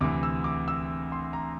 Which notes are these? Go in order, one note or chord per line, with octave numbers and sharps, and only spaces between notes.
D2 C3 E3 D6
E6
D6
E6
C6
A#5